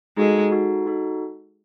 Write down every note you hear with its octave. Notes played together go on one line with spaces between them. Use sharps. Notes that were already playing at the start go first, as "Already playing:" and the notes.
G#3 D#4 F#4 A4
D#4 F#4 A4
D#4 F#4 A4